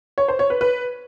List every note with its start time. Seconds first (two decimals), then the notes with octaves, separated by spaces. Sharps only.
0.18 C#5
0.28 C5
0.39 C#5
0.50 B4
0.61 B4